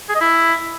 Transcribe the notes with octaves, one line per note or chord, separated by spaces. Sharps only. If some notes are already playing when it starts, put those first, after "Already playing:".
G#4
D#5
E4